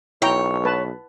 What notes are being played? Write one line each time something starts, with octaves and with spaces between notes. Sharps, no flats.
B1 E4 C#5 G5 A#5
B4 A5